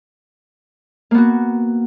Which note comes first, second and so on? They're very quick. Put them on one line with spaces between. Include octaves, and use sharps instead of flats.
A#3 B3 F#4